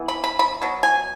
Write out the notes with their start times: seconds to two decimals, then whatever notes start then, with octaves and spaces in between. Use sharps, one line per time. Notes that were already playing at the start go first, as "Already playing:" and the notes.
Already playing: E3 B3
0.08 B5
0.24 B5
0.39 B5
0.62 B2 F#3
0.83 G#5